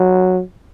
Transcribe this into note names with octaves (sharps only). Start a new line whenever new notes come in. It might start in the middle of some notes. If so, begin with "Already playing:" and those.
Already playing: F#3